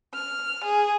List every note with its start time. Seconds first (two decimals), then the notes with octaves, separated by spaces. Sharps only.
0.13 F6
0.63 G#4